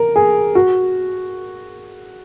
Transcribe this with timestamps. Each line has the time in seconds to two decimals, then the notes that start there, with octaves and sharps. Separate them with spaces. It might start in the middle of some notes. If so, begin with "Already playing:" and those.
Already playing: A#4
0.16 G#4
0.55 F#4